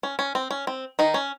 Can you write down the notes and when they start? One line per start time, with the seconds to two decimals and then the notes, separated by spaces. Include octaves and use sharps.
0.03 C#4
0.19 C#4
0.35 C4
0.51 C#4
0.67 C4
0.99 D#3 D#4
1.14 C#4